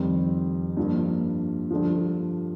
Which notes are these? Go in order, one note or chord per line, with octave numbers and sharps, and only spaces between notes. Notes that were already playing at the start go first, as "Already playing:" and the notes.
Already playing: F2 D#3 G3 C4
G2 F3 A#3
G2 D3 F3